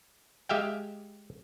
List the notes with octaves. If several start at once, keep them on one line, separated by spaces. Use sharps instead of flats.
G#3 G4 E5 F5 G5